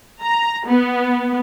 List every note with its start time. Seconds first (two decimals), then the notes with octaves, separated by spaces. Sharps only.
0.20 A#5
0.66 B3